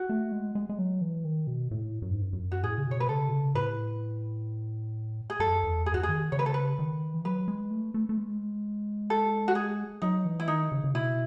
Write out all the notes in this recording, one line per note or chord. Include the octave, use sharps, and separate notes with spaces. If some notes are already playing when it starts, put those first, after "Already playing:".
Already playing: F#4
A3
G#3
G#3
G#3
F#3
E3
D#3
B2
A2
F#2
G#2
F#2
F#2
F#4
A2 G#4
C#3
B2 C#5
B4
C#3 A4
B2
C#3
A2 B4
G#4
F#2 A4
E2
F#2 G#4
E2 F#4
F#2
G#4
D#3
C#3 C#5
B4
A4
B4
D#3
E3
F#3 B4
G#3
A3
A3
A3
G#3
A4
F#4
G#4
F#3 D#4
E3
E4
D#3 D#4
C#3
C#3
B2 E4